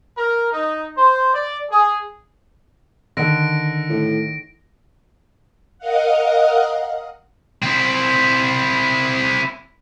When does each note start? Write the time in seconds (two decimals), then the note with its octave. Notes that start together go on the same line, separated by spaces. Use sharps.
0.16 A#4
0.53 D#4
0.97 C5
1.34 D5
1.71 G#4
3.17 D3 D#3 G#4 A#6 D7
3.90 A2
5.78 A#4 D#5 F5 F#5
7.62 C4 E4